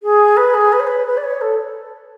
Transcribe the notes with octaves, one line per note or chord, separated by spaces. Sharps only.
G#4
B4
G#4
B4
C#5
B4
B4
D5
C#5
A4